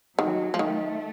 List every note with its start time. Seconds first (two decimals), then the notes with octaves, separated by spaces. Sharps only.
0.19 D#3 F#3
0.54 F3
0.59 D#3 A3